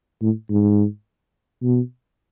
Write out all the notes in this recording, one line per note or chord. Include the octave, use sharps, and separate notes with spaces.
A2
G#2
B2